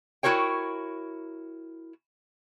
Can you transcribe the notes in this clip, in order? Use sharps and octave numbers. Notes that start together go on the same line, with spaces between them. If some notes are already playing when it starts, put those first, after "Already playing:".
E4 F#4 A#4 C#5 G5